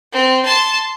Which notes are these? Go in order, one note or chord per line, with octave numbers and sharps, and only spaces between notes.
C4
A5 C6